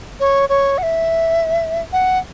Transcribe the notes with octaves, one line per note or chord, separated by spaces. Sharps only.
C#5
C#5
F#5
E5
F#5